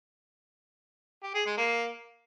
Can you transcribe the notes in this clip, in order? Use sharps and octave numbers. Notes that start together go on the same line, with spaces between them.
G4
G#4
G#3
A#3